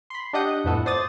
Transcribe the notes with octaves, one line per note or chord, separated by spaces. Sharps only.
B5 C6
D4 G4 D#5 F#5 D#6 G6
F2 A2 B3 F#4 A4
C5 D5 D#6 A6